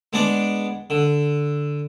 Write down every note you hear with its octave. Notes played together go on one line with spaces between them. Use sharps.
G#3 B3 D4 D5 D6
D3